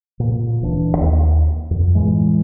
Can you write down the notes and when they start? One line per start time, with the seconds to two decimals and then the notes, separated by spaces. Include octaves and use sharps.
0.20 A#2
0.61 D1 E3 D4
0.97 D#2
1.71 F2
1.95 E2 A2 E3 G#3